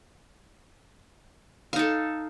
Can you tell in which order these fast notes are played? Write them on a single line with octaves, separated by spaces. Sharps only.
F5 D#4 A4